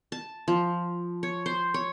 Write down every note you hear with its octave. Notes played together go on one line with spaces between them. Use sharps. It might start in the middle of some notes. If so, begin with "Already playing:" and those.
A5
F3
C#5
C5
C#5